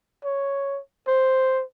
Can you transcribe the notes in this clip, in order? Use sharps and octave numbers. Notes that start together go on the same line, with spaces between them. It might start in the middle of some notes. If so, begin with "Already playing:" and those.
C#5
C5